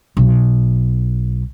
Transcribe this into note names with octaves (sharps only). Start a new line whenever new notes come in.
B1